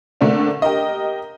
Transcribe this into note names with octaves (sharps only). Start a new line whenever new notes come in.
D3 A3 A#3 C4 D4
G4 A#4 D#5